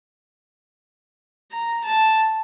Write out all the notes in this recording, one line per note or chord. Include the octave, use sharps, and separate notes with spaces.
A#5
A5